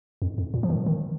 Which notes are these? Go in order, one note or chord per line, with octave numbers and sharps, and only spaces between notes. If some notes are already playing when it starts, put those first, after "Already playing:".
F2
F2
A#2
F3
D#3
D#3